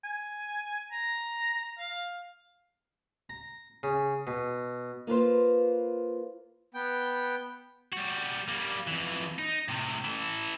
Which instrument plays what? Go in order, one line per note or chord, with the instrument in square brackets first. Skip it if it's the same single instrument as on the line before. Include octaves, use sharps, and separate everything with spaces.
[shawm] G#5
A#5
F5
[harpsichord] A#5
C#3
B2
[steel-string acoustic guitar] A#3 F4 B4 C5
[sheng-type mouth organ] B3 G5
[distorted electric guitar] G3 F#4
G3 A#3
F2 E3
D#4
A2 C3
E3 A4